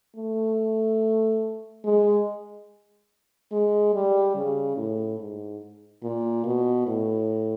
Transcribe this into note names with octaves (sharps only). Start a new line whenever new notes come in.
A3
G#3
G#3
G3
C#3
A2
G#2
A#2
B2
A2